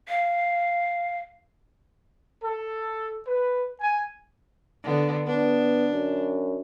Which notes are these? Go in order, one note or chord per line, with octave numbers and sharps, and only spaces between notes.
F5
A4
B4
G#5
D3 B3
B3 D4
F#2